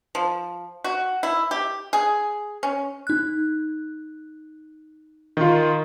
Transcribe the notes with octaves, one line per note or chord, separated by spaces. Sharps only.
F3
F#4
E4
G4
G#4
C#4
D#4 F#6
D#3 F4